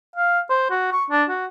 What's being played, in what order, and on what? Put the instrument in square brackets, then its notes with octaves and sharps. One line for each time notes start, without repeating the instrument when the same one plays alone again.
[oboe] F5
C5
F#4
C#6
D4
F#4